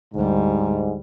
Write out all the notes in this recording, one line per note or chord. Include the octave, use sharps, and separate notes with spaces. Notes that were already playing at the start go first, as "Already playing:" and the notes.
D2 G#2 G3